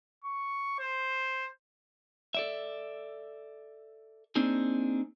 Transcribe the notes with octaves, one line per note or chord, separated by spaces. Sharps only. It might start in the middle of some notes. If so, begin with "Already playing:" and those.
C#6
C5
A4 D5 E5
A#3 C4 D4 D#4 G#4